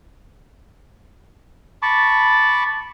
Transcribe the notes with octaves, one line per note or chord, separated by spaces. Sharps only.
A5 B5 C#6 D6